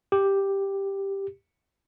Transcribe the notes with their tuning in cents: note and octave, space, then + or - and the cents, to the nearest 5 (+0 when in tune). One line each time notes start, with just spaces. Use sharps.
G4 +5